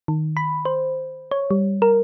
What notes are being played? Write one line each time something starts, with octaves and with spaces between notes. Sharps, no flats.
D#3
B5
C5
C#5
G3
A#4